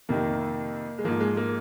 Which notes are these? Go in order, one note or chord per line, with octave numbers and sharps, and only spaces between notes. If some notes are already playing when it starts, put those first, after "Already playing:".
F2 C3 D#3 A#3
G#3
G#2 F3 A#3
G#3
A#3